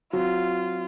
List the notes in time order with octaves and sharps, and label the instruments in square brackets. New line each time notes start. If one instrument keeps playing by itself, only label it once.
[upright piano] F#3 C4 F#4 [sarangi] F4